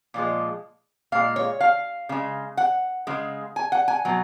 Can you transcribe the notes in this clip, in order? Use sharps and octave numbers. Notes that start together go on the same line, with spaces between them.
A#2 F3 G#3
A#2 G#3 F5
C#5
F5
C#3 G#3
F#5
C#3 G#3
G#5
F#5
G#5
B2 F#3